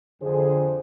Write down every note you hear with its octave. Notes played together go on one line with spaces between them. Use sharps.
F2 D3 G#4 C5